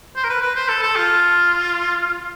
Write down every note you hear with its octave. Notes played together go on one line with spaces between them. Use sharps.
C5
A#4
B4
B4
C5
A4
A4
F4